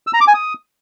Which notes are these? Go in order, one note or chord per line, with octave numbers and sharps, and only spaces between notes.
E6
A#5
D6
G#5
D#6